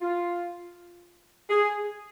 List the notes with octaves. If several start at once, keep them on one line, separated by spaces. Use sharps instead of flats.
F4
G#4